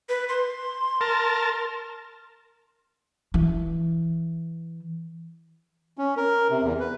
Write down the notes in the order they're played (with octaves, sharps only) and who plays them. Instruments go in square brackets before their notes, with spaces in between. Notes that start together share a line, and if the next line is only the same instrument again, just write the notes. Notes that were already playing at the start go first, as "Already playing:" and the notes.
[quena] B4
C6
[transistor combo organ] A#4 A5
[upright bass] E3
[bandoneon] C#4
A#4
C3
E2
B4